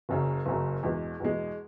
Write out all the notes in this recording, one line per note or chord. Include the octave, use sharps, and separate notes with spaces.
F#1 F#2 C#3
F#1 F#2 C#3
E2 B2 G#3
E2 B2 G#3